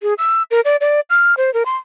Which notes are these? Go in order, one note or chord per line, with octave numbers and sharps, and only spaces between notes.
G#4
E6
A#4
D5
D5
F6
C5
A#4
C6